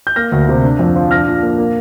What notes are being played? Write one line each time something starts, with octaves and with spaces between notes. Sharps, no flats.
G6
A#3 F6 A#6
D2
C3
D4
F2
F3
D4 F6 A#6
A#2
A#3
A#3